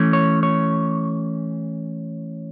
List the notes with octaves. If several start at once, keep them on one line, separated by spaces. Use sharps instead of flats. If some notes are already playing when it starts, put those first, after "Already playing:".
Already playing: E3 A3 C#4
C#5
C#5